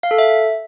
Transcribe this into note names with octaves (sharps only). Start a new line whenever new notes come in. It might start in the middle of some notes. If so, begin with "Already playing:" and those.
F5
A4
E5